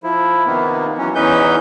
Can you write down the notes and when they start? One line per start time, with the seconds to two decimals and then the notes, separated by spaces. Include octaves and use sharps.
0.03 F3 E4
0.46 C3 D#3 A#3 B3
0.98 E3 F#3 C#4
1.15 E2 E3 C#4 D#4 B4 G6